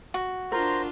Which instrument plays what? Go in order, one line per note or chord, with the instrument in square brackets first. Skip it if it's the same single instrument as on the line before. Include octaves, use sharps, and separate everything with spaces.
[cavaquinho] F#4
[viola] D4 F4 [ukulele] A#4 [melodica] C5 A#5